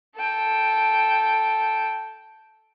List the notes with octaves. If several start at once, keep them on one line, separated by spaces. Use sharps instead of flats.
A4 G5